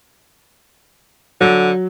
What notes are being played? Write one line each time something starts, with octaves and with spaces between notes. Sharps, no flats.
D3 F#3